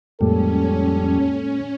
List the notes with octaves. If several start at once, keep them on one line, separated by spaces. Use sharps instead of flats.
F2 A2 G3 G#3 A#3 C#4 A4